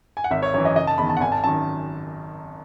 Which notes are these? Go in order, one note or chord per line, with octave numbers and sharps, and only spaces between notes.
G#5
F#5
G#1 E5
C#5
F#2 E3 C#5
D#5
F#1 D#5
A5
E2 D#3 B5
A5
F#5
G#1 G#5
A5
F#2 D#3 A5